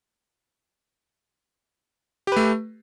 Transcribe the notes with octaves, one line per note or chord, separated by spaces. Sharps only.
A3 G4 B4